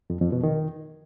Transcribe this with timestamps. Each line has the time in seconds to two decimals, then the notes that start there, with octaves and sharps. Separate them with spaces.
0.10 F2
0.21 F2
0.32 B2
0.43 D#3